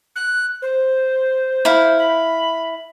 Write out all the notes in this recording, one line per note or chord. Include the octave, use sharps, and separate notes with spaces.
F#6
C5
E4 F5
B5